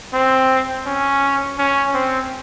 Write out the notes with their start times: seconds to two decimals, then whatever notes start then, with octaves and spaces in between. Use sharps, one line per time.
0.14 C4
0.86 C#4
1.58 C#4
1.94 C4